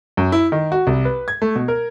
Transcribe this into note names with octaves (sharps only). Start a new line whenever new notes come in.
F#2
E4
D#3
F#4
C2
B4
G#6
A3
B2
A#4